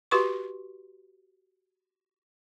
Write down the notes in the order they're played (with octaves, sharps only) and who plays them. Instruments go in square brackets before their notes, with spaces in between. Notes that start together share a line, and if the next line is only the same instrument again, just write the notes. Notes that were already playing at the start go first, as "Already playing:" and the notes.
[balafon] F#4 G4 B4 C6 C#6